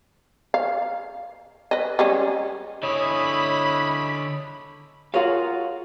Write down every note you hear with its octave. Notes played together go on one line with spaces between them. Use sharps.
F5
B4 D#5
G3 G#3 C#4
D3 E4 G#4 C#5 D#5 B5
F4 F#4 G#4 A#4 C#5 F5